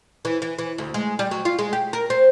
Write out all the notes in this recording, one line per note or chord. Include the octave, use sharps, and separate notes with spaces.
E3
E3
E3
D2
G#3
G3
F#3
F4
G#3
G4
A#4
C4